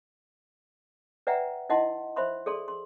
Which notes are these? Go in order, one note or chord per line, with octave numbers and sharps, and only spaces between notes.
B4 D5 E5 F#5 G5 A#5
D#4 E4 D#5 F#5 A5 C6
C5 E5 B5 C6
G#4 A4 D5 C6
C6